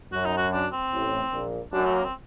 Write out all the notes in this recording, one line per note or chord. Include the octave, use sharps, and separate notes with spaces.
F#2 F#4
D#4
F#4
D4
C4
A1 A2
A#1 A#2
F#2 F#3 D4
A3
A#3
C4